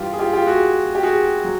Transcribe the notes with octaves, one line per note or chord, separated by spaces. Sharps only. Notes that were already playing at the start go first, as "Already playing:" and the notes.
Already playing: G2 E3 F4 G4
G#4
F4 G4
F4 G4
F#4 G#4
G4
F#4 G#4
F#3